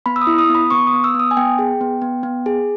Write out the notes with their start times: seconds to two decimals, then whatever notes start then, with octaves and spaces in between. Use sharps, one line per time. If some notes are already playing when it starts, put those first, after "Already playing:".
0.06 B3 B5
0.16 E6
0.22 D#6
0.27 E4
0.39 D#6
0.49 B3
0.55 B5
0.71 B3 C#6
0.87 D#6
0.93 B3
1.04 E6
1.15 B3 D#6
1.31 G#5
1.37 B3 G5
1.59 G#4
1.81 B3
2.02 B3
2.23 B3
2.46 G#4